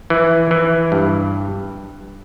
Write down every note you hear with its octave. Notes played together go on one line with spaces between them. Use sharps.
E3
E3
G2